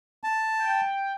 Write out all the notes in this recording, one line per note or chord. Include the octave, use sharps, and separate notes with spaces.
A5
G5